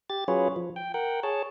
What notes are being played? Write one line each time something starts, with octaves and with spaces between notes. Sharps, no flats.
G4 A6
F#3 C#4 F4 G#4 B4 C#5
F3
G5
A#4 F#5 G5
G#4 C#5 A5